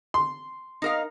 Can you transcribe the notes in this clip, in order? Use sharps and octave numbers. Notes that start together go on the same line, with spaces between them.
C6
D#4 A#4 F5